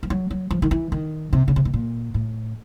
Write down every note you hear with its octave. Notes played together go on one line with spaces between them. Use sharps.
F3
F#3
F#3
F3
D#3
E3
D#3
C3
C#3
C3
B2
A#2
A2